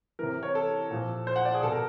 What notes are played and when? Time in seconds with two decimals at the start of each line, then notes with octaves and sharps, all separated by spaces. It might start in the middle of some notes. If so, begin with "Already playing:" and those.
0.19 C3 E3 A#4
0.43 C#5
0.55 A4
0.91 A#2 F3
1.27 C5
1.36 F#5
1.45 D5
1.54 G#4
1.63 B2 A4
1.72 A#4